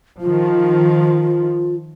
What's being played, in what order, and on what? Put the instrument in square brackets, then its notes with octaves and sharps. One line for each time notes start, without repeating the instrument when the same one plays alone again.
[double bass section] D#3 F3 [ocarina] F4